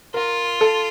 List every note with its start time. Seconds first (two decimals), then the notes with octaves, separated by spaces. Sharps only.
0.14 F4 A#4
0.61 A4